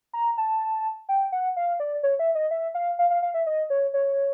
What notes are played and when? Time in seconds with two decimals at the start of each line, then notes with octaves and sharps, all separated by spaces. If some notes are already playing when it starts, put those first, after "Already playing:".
0.13 A#5
0.38 A5
1.09 G5
1.32 F#5
1.56 F5
1.80 D5
2.03 C#5
2.19 E5
2.35 D#5
2.51 E5
2.75 F5
2.99 F5
3.10 F5
3.23 F5
3.34 E5
3.47 D#5
3.70 C#5
3.94 C#5